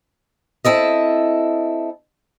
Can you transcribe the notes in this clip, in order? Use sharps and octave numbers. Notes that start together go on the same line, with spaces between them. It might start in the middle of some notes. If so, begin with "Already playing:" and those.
C4 E4 A4 D#5